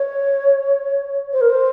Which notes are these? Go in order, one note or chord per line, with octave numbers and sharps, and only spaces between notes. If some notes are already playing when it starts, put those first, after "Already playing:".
Already playing: C#5
C5
A#4
C5